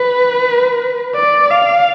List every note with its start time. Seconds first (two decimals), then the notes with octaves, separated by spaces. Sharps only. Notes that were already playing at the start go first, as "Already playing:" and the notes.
Already playing: B4
1.15 D5
1.50 F5